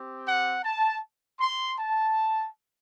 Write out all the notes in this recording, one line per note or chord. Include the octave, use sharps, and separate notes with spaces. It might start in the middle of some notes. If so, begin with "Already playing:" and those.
Already playing: C4 G4
F#5
A5
C6
A5